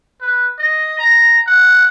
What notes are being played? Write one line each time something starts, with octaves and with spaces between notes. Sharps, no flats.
B4
D#5
A#5
F#5